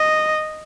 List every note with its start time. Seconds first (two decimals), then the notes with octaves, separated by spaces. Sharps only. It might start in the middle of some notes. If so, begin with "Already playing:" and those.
Already playing: D#5